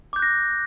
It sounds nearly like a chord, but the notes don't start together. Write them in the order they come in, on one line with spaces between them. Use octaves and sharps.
D6 G6 F#6 A#6